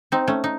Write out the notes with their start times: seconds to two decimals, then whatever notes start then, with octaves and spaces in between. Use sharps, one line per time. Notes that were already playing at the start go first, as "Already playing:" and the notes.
0.12 C4 D#4
0.28 A3 C#4
0.44 D#4